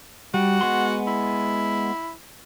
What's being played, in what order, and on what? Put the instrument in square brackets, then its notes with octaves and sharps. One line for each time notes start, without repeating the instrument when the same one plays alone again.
[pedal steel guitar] G3 [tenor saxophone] F#4
[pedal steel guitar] G#3 B3 C6
[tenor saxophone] E4